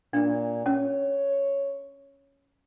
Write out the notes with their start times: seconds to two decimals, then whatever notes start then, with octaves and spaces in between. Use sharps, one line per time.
0.13 A#2 D4
0.66 C#4 C#5